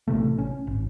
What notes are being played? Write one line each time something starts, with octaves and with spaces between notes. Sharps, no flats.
A1 C3 A3
C#4
G#1